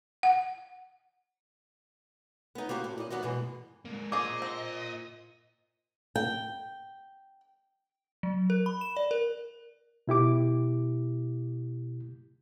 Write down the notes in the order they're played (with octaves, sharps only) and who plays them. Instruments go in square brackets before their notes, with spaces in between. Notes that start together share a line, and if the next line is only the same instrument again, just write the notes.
[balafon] F#5
[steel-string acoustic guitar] B3 D#4
A#3 C4 F#4 G4
A2
A#2 D5 D#5
D#2 B3 F#4 D5 D#5
G2 B2 E3 G#3
[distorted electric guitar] G#3 A#3
[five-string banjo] C4 G#4 [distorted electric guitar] F4 A#4 [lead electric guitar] D#5 [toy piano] D6
[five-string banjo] C4
[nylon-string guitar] G5
[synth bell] F#3
A#4
B5
E7
D5
A#4
[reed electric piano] B2 E4 G4 D6